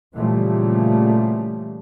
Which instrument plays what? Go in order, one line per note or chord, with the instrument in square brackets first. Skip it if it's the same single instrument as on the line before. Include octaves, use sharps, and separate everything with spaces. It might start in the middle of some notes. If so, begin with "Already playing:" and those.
[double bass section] A#2 C#3 E3 F3 G3 A3